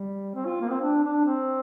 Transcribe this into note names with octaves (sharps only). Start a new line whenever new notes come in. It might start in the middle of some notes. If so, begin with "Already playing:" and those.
Already playing: G3
C4
F4
A#3
C4
D4
D4
C4